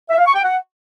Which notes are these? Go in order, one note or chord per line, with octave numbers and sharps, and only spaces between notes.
E5
F5
C#6
G5
F#5